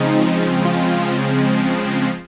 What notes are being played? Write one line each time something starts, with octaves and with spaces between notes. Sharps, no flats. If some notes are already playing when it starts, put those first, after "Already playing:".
Already playing: C#3 F3 G#3 C4 D#4
F4